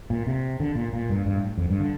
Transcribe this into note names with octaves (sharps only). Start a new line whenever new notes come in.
A#2
C3
D3
A#2
A#2
G2
G2
A2
F2
G2
D3